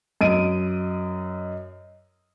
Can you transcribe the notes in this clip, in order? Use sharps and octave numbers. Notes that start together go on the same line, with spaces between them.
F#2 D#5 D7 D#7